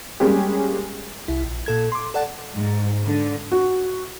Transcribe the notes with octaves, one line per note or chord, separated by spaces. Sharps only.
G3 G#3 A#3 C#4 G4 G#4
C2 E4
A#1
A#2 A4 G#6
C6 D6
A4 D5 F#5 A5
G#2
D3
F#4